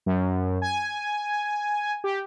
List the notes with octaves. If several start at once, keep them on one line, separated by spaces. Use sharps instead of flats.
F#2
G#5
G4